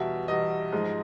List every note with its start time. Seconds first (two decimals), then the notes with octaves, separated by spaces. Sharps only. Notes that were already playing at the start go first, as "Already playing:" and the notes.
Already playing: E2 B2 G3 E5
0.28 E2 B2 G3 D#5
0.72 G#2 F3 G#3